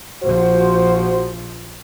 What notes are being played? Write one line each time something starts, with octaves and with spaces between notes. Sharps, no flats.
A#1 F3 F#4 C5